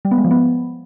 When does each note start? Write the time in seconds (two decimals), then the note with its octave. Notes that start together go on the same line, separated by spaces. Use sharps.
0.05 G3
0.11 B3
0.18 G#3
0.24 F3
0.31 B3